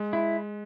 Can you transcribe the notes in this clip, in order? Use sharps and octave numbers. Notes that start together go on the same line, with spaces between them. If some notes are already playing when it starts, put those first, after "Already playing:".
Already playing: G#3
E4